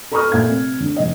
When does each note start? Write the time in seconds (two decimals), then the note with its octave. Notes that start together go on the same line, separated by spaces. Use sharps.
0.12 A4 A#5 B5 C#6 D#6 F6
0.32 A#2 A3 F5 G#6
0.48 C3
0.80 D3
0.97 F1 D#5